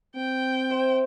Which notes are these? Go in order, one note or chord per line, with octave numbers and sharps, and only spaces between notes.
C4 G5
C5 E5